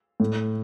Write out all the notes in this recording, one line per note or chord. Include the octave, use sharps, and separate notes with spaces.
A2